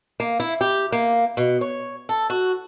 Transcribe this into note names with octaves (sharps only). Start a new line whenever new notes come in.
A#3
E4
G4
A#3
B2
C#5
A4
F#4